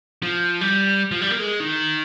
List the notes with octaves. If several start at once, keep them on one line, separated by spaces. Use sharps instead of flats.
F3
G3
F3
G3
A#3
G#3
D#3